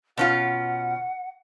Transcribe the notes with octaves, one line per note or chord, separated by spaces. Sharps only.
B2 C#4 F4 F#5